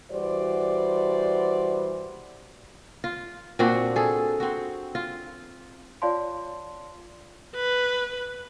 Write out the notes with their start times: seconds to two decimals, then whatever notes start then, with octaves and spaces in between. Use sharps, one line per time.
0.11 E3 G3 F#4 C5 D5
3.04 F4
3.59 A#2 C4 D4 F#4
3.96 G#4 A4
4.40 C4 F#4
4.95 F4
6.02 F4 C#5 D5 F5 A5 C6
7.55 B4